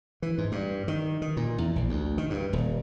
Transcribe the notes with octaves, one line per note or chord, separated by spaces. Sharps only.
E3
G#2
G2
D#3
D#3
A#2
E2
A#1
D2
D#3
G2
D#1